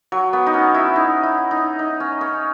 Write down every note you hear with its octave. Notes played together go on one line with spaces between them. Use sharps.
F#3
B3
D#4
C#4
E4
D#4
E4
D#4
D#4
C#4
C#4